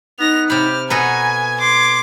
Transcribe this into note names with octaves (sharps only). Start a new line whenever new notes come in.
B3 D#4 A#6 F7
C3 G4 B5 F6
B2 A4 B4 G#5 A#5 G#6
C6 D6